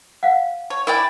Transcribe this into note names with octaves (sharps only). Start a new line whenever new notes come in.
F5 F#5
C#5 A5
E4 A#4 D5 G5 G#5 B5